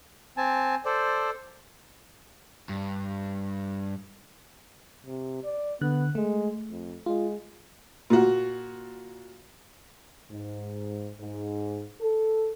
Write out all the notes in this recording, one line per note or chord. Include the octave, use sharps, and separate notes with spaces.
C4 G#5 A5
A4 C5 D5
G2
C3
D5
D3 B3 F#6
G#3 A3
F2
G#3 F4
A#2 F#4
G#2
G#2
A4